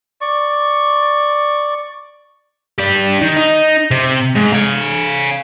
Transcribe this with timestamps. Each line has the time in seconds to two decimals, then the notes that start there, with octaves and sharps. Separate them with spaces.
0.21 D5 C#6
2.78 D4 G4
3.21 D#3
3.36 D#4
3.91 C3
4.35 G#2
4.52 F5 G#5